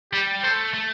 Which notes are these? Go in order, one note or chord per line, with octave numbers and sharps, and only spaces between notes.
G3 G4
A3 C5
A3